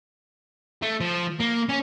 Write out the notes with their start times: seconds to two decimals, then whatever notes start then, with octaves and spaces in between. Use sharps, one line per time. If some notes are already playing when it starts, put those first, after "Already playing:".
0.82 A3
1.00 F3
1.40 A#3
1.69 C#4